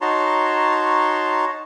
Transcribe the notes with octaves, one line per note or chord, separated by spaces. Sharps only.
D#4 F#4 C#5 A5 A#5 C6